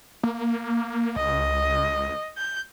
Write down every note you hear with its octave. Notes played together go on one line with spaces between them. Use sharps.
A#3
C#2 D#5
G6